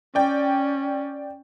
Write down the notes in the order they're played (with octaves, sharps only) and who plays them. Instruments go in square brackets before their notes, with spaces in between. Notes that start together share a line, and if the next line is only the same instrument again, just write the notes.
[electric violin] C#4 [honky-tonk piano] D5 G5